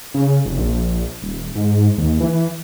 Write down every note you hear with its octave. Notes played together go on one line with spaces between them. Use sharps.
C#3
F1
A#1
D#1
G#2
D#2
E3